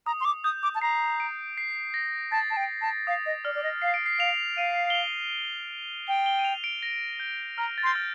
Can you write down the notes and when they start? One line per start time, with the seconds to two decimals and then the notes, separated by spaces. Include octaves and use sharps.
0.06 A#5 D#6
0.21 C6
0.25 D6
0.44 D#6 G6
0.63 D6
0.75 A5
0.82 A#5 C7
1.20 D7
1.58 C7
1.94 A#6
2.32 A5 A6
2.50 A5
2.57 G5
2.82 A5
3.07 F5 D#6
3.26 D#5
3.45 D5 F6
3.55 D5
3.63 D#5
3.82 F5 C7
3.94 D7
4.06 C7
4.19 F5 F7
4.57 F5 D#7
4.90 G7
4.95 F7
6.07 G5 G7
6.26 G7
6.39 D#7
6.45 F7
6.64 D7
6.83 A#6
7.20 G6
7.58 A#5 F6
7.78 A6
7.83 C6
7.87 G6
7.95 F6